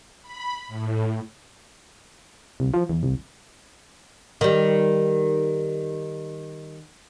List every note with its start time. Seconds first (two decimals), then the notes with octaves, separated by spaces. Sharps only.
0.22 B5
0.67 A2
2.60 C2
2.74 F3
2.89 E2
3.03 C2
4.41 D#3 G3